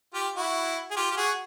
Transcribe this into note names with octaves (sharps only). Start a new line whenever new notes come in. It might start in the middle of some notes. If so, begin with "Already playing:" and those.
F4 G4
E4 F#4
G#4
F4 G4
G4
F#4 G#4